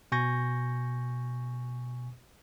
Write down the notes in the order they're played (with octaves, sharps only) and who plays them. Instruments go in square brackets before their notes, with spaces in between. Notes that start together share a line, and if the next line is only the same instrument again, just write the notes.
[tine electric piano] B2 G#5 C#6 G6 A#6